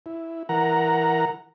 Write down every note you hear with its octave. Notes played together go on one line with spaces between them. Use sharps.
E4
E3 A#4 F#5 A#5